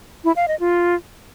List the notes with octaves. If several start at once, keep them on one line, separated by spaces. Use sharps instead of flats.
E4
F5
D#5
F4